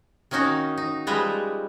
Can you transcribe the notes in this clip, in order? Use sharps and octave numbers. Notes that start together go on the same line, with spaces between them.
D#3 A#3 C#4 D#4 F#4
D#4
F3 G3 G#3 B4 A#5